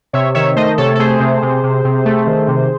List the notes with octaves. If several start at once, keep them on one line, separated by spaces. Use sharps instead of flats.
C3 C#5 E5
D#3 C#5 E5
A3 C5 D#5
C3 A4 C#5
A4
A3 G#4 C5
C3
C3
C3
C3
A3
D#3
C3